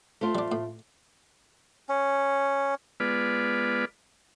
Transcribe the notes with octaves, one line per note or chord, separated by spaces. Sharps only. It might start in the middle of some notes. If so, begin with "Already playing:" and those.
A3 C4 F4
G3 D4
A2
C#4
G#3 B3 F4 B4 D5